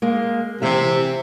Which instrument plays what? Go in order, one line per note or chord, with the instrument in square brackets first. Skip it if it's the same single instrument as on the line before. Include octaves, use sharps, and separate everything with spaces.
[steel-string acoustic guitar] G#3 A#3
[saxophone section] C3 [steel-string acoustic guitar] E3 C4 E5